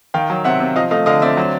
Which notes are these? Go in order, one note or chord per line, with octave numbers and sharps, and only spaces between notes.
D#3 F5 G5
F#3
C3 E5 F#5
C3
F3 D#5 F5
A3 D#5 F5
D3 D#5 F5
C4 D5 E5
F#3